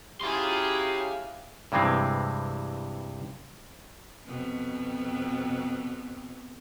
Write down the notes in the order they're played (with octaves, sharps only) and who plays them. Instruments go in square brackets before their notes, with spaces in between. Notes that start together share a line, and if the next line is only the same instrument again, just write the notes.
[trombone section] F#3 C#4 G4 [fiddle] E4 G#4 [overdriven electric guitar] F5 C6
[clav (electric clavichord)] G2 C3 E3 G#3 C4
[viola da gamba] F2 B2